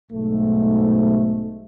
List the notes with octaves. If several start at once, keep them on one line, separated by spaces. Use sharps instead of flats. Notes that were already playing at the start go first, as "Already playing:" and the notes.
B1 G#2 A3